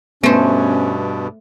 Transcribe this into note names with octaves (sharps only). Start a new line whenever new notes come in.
G2 B2 A3 B3 C#4 C5